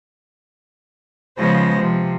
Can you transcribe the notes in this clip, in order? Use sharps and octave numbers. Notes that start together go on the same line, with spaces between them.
C#3 F3 G#3 B3 C5 A#6
C3 F3